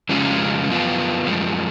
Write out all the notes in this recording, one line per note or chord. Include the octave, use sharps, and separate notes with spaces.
F2 C#3 G#3 C#4 F4
F#2 F3 B3 F4
F#2 F3 G#3